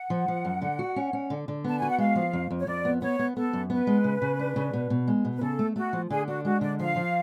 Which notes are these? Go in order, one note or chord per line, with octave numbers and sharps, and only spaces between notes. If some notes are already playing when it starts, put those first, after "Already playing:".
Already playing: F#5
F3
F3
F#2
D3
F#4
C#4
C#4
D3
D3
B3 A5
F#4 G#5
F#5
G#3 F5
F3
F2
F2
C#5
F2 D5
B3
B3 C#5
B3
B3 A4
F#2
B3 B4
G#3
C#3
C#3
D4
C#3
B2
B2
G#3
B2
B4
C#3 A4
A3
A3 F#4
F3
D3 G#4
D4 F#4
G#3 F#4
D3 D5
F3 F5
F3